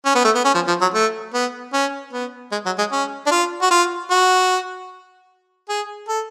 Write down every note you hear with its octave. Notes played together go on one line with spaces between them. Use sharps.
C#4
B3
A3
B3
C#4
F3
F3
F#3
A3
B3
C#4
B3
G#3
F#3
G#3
C#4
D4
F4
F#4
F4
F#4
G#4
A4